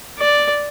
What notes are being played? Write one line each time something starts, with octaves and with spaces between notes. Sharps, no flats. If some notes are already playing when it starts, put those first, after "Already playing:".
D5